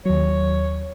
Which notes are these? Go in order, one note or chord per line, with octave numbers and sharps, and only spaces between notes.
D#2 F#3 C#5